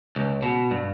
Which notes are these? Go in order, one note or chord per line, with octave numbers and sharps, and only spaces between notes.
C#2
B2
G2